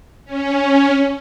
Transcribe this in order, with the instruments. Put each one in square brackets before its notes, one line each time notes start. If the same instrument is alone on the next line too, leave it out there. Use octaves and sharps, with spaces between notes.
[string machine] C#4